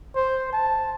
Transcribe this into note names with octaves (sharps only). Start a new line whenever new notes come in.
C5
A5